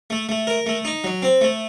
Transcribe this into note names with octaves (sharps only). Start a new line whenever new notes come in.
A3
A3
A#4
A3
D#4
F#3
C4
A3